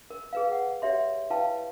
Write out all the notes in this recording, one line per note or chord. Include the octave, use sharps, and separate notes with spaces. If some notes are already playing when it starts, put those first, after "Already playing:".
A#4
G#4 B4 F5
F#5
G4 C#5 E5 C6
E4 B4 F5 G5 A5